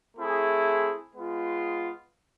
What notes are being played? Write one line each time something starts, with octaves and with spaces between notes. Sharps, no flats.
A3 C4 E4 G#4
G#3 B3 F4